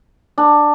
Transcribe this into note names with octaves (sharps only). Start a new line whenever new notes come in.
D4